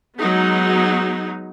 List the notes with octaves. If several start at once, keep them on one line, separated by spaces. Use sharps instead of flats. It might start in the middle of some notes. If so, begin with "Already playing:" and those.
F#3 G#3 B3 D#4